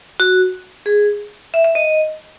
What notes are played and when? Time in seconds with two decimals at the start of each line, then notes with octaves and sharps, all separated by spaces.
0.20 F#4
0.86 G#4
1.54 E5
1.65 E5
1.75 D#5